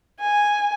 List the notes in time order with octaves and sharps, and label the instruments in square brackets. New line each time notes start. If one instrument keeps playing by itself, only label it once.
[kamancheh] G#5